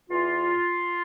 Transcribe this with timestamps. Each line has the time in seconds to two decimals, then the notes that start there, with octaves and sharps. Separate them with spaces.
0.10 E2 E3 F4